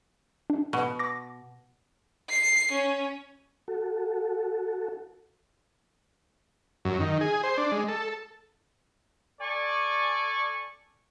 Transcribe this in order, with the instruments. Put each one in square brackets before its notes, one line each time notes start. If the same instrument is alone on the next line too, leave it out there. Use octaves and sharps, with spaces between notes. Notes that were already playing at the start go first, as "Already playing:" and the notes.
[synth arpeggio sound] D4
[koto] B2
[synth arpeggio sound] D6 A#6
[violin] C7
C#4
[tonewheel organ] F#4 A4
[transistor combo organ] F#2
D#3
G#4
C5
D4
G#3
A4
[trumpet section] A4 D5 G#5 C#6